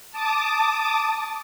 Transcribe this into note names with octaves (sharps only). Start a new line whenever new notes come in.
A5 D6 D#6